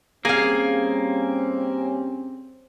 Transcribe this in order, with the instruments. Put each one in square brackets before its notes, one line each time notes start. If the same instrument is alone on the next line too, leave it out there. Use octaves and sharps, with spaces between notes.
[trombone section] G2 G3 C#4 [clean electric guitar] A#3 [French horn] C4 [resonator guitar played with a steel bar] G#4 F5